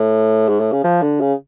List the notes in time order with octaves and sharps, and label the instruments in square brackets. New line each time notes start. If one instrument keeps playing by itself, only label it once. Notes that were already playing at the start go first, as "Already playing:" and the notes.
Already playing: [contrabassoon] A2
G#2
A2
C#3
F3
D3
C#3